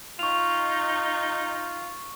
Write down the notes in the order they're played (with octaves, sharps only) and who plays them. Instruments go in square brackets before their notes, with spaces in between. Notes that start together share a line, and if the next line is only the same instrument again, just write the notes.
[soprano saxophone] D#4 [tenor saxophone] F4 [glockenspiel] C#6 F7